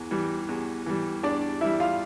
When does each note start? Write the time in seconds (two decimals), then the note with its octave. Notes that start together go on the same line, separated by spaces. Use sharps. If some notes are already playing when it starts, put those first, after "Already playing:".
Already playing: E2 E3
0.11 E3 G3
0.49 E2
0.86 E3 G3
1.23 E2 D4 D5
1.61 E3 G3 E4 E5
1.80 F4 F5